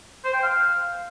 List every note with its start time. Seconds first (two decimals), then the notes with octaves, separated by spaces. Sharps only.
0.25 C5
0.34 G5
0.43 F5